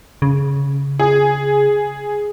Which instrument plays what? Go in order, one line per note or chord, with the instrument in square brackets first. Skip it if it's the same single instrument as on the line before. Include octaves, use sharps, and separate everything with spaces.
[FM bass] C#3
[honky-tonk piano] G#4